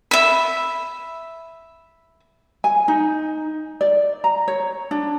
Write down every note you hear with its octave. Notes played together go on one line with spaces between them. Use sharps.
E5 B5
G#5
D#4
D5
A#5
C#5
D4